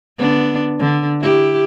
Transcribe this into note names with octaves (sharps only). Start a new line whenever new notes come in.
D3 B3 D4
D3
E4 G4